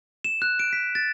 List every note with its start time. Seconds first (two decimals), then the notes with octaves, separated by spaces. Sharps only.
0.24 E7
0.42 F#6
0.59 D7
0.73 B6
0.95 A6